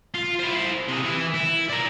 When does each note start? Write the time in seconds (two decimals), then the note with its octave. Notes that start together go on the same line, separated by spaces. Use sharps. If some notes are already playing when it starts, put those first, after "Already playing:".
0.14 F4
0.39 E4 C5
0.88 C3 G#4
1.03 E3 E4
1.34 E4
1.69 A#4 D5